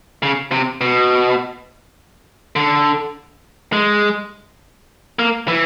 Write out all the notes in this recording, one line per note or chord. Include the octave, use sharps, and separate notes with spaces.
C#3
C3
B2
D3
G#3
A#3
E3